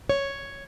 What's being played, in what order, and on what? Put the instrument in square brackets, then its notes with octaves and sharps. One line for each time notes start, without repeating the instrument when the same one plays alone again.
[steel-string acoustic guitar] C#5